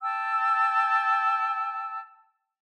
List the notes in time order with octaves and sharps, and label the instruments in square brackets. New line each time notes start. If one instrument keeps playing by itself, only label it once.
[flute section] G5 A5 E6